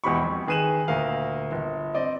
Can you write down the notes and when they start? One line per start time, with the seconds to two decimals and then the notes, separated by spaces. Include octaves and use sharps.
0.04 E1 E2 G4 B5 C#6
0.22 F2
0.47 D#3 G#4 B4 D#7 E7 F#7
0.88 D2 A#2 A#4 F5
1.52 G1
1.94 C4 D5 D#5